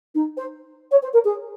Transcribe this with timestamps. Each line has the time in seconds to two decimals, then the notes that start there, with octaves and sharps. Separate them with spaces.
0.14 D#4
0.37 C5
0.91 C#5
1.02 C5
1.13 A#4
1.24 G#4